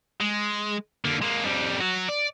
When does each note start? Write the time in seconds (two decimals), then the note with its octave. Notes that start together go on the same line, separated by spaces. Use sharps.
0.21 G#3
1.05 D3 A#3
1.22 G#3 A#3
1.45 F2 G3
1.80 F#3 F#4
2.08 D5